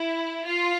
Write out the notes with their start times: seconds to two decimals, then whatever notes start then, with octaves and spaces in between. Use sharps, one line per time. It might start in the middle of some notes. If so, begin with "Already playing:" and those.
Already playing: E4
0.45 F4